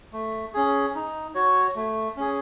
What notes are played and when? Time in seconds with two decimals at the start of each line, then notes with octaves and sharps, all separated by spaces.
0.13 A3
0.54 C#4 G#4
0.95 D#4
1.35 F#4 C#5
1.76 A3
2.17 C#4 G#4